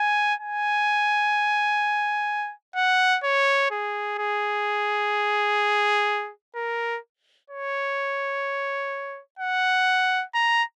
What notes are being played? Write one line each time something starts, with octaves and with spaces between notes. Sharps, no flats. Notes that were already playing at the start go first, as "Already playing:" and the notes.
Already playing: G#5
G#5
F#5
C#5
G#4
G#4
A#4
C#5
F#5
A#5